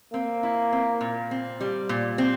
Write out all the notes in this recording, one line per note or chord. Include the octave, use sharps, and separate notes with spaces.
A#3 C4
E4
C4
A#2
C4
G3
A#2
C4